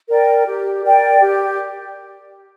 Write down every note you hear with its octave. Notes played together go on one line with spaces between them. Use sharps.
A#4 D5 G5
G4
A#4 D5 G5
G4